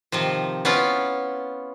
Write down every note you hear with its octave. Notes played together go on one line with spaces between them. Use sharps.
C3 D#3 F3
B3 C#4 E4 F4